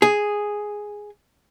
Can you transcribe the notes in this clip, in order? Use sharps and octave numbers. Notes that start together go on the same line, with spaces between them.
G#4